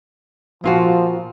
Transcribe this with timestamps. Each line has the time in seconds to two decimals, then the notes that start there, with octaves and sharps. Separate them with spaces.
0.64 A#2 F3 F4 F#4